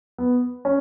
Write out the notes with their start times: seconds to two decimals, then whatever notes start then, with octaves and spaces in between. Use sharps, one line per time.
0.18 B3
0.65 C#4